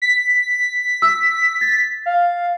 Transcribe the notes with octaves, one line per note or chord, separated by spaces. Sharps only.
B6
E6
A6
F5